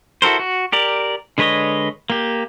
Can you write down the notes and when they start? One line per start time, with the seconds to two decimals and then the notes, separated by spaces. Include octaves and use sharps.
0.22 E4 F#4 A4 A#4 C5
0.39 F#4
0.72 G4 A#4 D5
1.38 D3 G#3 B4 C#5 D#5
2.10 A#3 G4